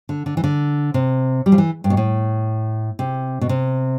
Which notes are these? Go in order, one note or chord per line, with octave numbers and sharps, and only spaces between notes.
D3
D3
E3
D3
C3
G3
F3
E3
G2
B2
A2
C3
B2
C3